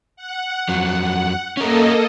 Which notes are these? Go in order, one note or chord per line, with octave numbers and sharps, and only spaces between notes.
F#5
F2 F#3
A#3 C#4 A4 A#4 D#5